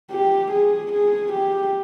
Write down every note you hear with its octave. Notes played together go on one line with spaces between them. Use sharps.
G4
G#4
G#4
G4